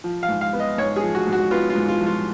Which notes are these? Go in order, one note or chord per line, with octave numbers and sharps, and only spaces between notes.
F3
F5
G#2
F5
B3
D#5
G#2 C#5
G#4
F3
F#4
G#2
F#4
B3 F4
F4
G#2
F4
F3
F4